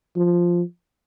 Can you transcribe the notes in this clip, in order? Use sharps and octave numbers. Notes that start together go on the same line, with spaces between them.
F3